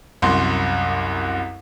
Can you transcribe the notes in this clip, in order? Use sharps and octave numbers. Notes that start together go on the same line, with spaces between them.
C2 F#2 C6